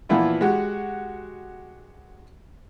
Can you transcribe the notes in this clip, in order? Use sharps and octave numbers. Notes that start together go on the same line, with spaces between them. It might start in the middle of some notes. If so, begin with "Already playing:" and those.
A#2 E3 F3 B3 E4 F4
G#3 F#4 G4